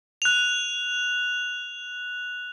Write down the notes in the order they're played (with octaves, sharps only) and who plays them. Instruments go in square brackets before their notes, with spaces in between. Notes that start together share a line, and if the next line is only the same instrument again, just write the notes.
[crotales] F#6 F7